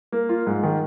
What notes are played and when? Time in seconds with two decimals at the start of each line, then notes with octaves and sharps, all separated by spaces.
0.12 A#3
0.29 F4
0.46 G#2
0.63 D#3